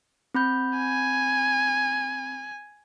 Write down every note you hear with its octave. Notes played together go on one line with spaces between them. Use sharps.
C4 B5 G6
G#5